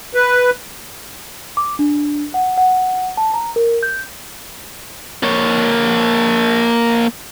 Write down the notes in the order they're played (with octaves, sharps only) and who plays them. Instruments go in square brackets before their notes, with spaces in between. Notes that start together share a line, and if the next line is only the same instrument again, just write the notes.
[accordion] B4
[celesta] D6
D4
F#5
F#5
A5
A#5
A#4
G6
[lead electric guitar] A#3 C#5